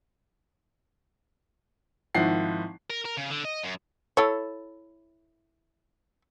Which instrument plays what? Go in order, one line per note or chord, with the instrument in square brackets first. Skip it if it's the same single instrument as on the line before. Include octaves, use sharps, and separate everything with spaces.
[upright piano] G#1 D#3 F3 E4 F#5 C7
[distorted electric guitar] A#4
A#4
C#3
D3
D#5
F#2
[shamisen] E4 A4 C#5